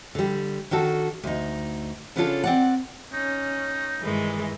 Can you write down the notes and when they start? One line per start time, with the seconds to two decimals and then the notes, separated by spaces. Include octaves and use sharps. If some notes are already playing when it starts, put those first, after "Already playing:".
0.15 D3 G3
0.71 D#3 D4 F#4 A4
1.24 D2 D#4
2.16 C#3 B3 C#4 D4 F4 A4
2.44 C4 D5 F#5
3.14 C#4 D#4
4.01 G2 D#3 E3 G#3